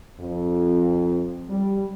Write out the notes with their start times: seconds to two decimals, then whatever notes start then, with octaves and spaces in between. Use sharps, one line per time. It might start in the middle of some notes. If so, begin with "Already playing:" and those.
0.20 F2
1.50 G3